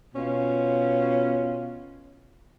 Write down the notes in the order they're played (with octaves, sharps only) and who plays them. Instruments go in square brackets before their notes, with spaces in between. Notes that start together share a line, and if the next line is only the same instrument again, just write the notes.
[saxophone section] B2 C#4 F4